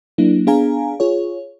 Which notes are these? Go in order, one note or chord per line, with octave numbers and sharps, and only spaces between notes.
F#3 A#3 D4 E4
B3 D4 G#4 F5 G#5 A#5
F4 G#4 C#5